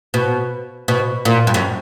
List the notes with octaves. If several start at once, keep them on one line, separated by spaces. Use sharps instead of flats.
B2
B2
A#2
G2
F#2